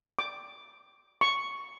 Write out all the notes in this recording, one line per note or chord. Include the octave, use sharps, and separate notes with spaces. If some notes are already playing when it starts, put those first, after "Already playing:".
D6
C#6